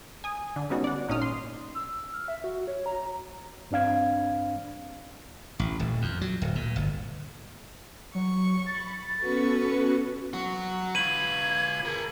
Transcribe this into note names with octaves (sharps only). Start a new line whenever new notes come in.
G#5 D#6
D3
G3 G#3 B3 C#4 D#4 F#4
D5 F#5
G#1 A#2 C#4 D#4 D#6 F6
C6
E6
F6
E5
F#4
C#5
A#5
G2 C4 D4 F5 G#6
A1
D#1
F2
F#3
D1
A#2
G1
F#3 C#6
B5 A6
B3 C#4 F#4 A4 B4 C#6
F#3 F#4
F4 B4 G#6 D#7 F#7
G#4 A#4